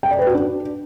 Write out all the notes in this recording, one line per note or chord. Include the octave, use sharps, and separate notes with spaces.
G5
D5
B4
F#4
D4